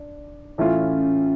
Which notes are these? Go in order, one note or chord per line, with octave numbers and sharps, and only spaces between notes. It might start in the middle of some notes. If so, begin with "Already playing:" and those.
Already playing: D4
A2 E3 A3 C#4 F4